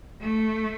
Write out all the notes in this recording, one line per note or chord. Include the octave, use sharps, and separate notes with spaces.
A3